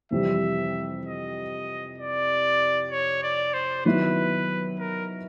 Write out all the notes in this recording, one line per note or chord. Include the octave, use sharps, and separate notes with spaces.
F2 C3 E3 G3 E5
D#5
D5
C#5
D5
C5
D#3 F#3 B3 E4 B4
A#4